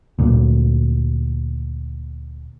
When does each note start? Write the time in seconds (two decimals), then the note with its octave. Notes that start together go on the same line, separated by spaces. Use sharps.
0.19 D2 A#2